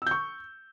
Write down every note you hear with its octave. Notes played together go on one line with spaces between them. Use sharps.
C#6 E6 G6